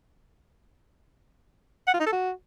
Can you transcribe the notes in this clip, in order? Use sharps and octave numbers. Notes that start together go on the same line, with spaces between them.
F#5
F4
D#4
A4
F#4